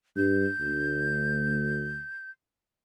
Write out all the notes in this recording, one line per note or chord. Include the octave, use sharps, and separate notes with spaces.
G2 G6
D2